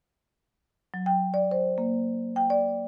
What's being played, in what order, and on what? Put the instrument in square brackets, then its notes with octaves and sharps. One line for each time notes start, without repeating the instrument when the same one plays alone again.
[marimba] F#3
G5
D5
C5
A#3
G5
D5